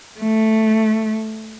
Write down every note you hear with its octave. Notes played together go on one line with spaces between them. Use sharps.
A3